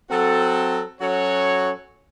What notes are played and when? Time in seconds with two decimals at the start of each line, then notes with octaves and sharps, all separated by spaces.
0.10 F#3 C4 F#4 A4
1.00 F#3 C#4 F#4 A4 C#5